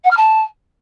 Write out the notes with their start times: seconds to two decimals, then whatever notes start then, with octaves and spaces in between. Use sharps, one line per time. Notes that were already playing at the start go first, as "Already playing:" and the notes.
0.04 F#5
0.10 F6
0.16 A5